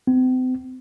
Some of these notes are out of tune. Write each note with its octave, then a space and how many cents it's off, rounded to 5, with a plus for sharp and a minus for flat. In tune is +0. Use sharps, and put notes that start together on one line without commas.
C4 -40